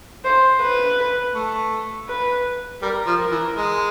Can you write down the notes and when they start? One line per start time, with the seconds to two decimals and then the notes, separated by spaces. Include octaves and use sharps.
0.24 C5
0.61 B4
1.35 A3
2.09 B4
2.82 G3 A#4
3.06 F3
3.19 A#4
3.31 E3
3.55 G#3